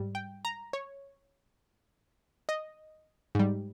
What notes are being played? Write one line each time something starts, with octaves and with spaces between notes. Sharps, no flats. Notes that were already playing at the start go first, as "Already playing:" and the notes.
Already playing: G#2 G3
G5
A#5
C#5
D#5
G#2 G3